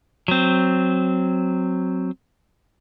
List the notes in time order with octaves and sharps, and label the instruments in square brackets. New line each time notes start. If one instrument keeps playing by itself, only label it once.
[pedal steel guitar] F#3 C4